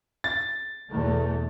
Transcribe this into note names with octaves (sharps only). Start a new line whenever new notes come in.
A6
E2 B2 A3